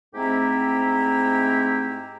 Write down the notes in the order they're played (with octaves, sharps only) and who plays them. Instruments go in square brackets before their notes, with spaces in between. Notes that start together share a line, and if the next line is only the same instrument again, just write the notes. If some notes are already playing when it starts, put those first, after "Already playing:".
[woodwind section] G#2 A3 C4 E4 G4 A#5